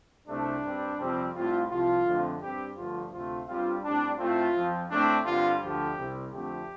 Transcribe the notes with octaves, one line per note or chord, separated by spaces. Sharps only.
C2 C3 A3 C4 D4
G2 G3 C4
F2 C3 G3 C4
A2 G3 C4 F4
C2 C3 F3 F4
F2 D3 A3 C4
G2 G3 C4 G4
G2 D3 F3 A3 F4
D2 C3 A3 C4 F4
G2 G3 C4 F4
A2 G3 C4 D4
A2 A3 C4 F4
F2 F3 C4
A2 A3 C4 D4
G2 D3 G3 C4 F4
D2 D3 F3 A3 G4
C2 C3 G3 C4
F2 D3 A3 C4 G4